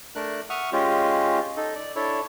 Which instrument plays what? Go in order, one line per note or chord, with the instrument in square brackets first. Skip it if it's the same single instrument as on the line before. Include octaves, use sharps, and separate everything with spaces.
[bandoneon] A3 D4 A#4 F#6
E5 F#5 C#6 D#6 F6
G#3 C#4 F4 G4
D#4 A4
D5
D4 E4 A4 C#5